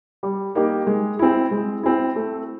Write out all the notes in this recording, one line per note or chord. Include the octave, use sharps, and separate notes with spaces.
G3
A#3 D#4 G4
G#3
C4 E4
G#3
C4 E4
A3